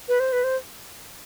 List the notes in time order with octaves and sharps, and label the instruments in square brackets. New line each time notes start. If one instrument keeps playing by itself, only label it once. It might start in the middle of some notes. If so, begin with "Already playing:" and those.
[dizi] B4
C5
B4
C5